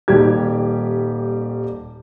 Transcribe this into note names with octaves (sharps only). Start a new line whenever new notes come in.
D#1 D#3 G3 G4 G#6